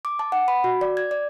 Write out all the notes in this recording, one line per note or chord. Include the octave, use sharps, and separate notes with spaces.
D6
A5
F#5
B5
F#4
D5
G#6
D5